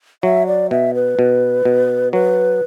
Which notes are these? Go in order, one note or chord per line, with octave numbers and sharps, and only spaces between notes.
F#3 E5
D5
B2 E5
B4
B2
B2
F#3 B4